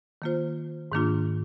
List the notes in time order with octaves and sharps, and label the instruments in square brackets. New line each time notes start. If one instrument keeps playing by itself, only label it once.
[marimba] D#3 A#3 F4 C5
G#2 D#3 A#3 D4 F4